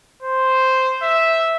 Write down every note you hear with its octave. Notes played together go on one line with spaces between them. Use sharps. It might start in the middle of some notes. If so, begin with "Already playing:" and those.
C5
E5